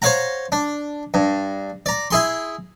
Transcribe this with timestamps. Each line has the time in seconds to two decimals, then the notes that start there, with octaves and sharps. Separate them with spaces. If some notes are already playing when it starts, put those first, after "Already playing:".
0.02 C5 C#5 F5 F#5 A#5
0.52 D4
1.14 G2
1.86 D5 A#5
2.11 E4 G#4 C6